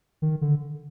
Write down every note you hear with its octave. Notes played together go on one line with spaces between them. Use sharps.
D#3
D3